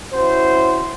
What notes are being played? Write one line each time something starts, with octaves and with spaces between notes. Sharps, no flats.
C#4 E4 F#4 C5